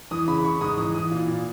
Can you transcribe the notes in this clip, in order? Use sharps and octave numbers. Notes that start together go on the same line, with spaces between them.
E3 D#6
C#3 B5
B5
C#3 C#6
G#2 D#6
E3 D#6
E3 D#6
A#2
A#2